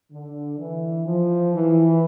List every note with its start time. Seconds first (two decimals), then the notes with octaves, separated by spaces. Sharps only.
0.11 D3
0.58 E3
1.06 F3
1.53 E3